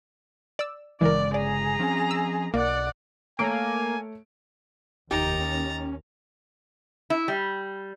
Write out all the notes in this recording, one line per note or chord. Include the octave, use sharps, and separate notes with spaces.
D5 E6
G1 C#3 E3 G#3 A#4 D5
G#4 D5 A#5
F3 C4 C#4
E6
B1 A#3 D5 F#5
A3 A#3 C#5 G#5 D7
F1 D#2 D#4 G4 A#5 A6
C#4
E4
G3